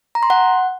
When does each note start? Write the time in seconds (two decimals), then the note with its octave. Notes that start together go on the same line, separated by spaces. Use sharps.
0.15 A#5
0.23 C6
0.30 F#5